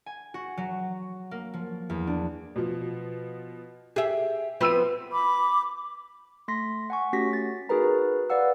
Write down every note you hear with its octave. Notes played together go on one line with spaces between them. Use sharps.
G#5
F#4
F#3
A#3
F3
E2
D4
B2 F3
G4 G#4 E5
F3 B3 C4 C5 E6 D#7
B5 D6
A3 C6 A#6 B6
F#5 G#5 C#6
A3 C#4 F#4 G4 A#6 B6
A6
D#4 F#4 G#4 A#4 B4 A#5
B4 D5 F5 F#5 E6